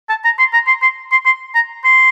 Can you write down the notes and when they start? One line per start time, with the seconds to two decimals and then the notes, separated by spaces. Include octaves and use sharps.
0.09 A5
0.25 A#5
0.39 C6
0.53 A#5
0.67 C6
0.82 C6
1.12 C6
1.26 C6
1.55 A#5
1.85 C6